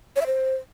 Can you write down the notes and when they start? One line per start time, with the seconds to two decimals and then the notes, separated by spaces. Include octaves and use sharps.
0.16 C#5
0.21 E5
0.26 C5